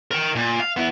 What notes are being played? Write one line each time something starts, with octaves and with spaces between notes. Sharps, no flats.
A#4 G5
A#2
F5
B3 E4